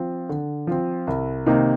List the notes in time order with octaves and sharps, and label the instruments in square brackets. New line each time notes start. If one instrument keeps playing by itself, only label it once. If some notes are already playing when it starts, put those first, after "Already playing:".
Already playing: [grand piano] F3 C4
D3
F3 C4
C2
C3 D#3 A#3 D#4